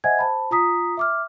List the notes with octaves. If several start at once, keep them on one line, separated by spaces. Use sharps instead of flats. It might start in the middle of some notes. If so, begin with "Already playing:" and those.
C5 D#5 E5 F#5 G#5 G#6
C5 A5 B5
F4 A#5 D#6 B6
E5 D6 F6